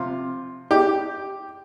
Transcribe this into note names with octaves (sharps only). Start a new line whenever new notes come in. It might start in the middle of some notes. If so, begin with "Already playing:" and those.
Already playing: C3 F3 F4
G4